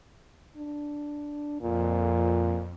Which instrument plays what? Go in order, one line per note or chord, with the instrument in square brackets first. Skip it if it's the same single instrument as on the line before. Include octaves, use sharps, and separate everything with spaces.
[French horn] D4
[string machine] F2 [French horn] A#2